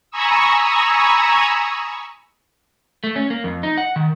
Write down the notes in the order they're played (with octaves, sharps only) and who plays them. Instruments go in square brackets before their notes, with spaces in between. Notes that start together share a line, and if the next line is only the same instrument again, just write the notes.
[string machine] G#5 A#5 B5 C#6 D#6 E6
[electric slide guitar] A3
C#4
A#3
F2
D#4
F#5
D#3